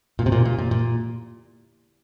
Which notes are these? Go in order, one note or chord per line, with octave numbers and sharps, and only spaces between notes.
A#2
C3
A#2
A#2
A#2
A#2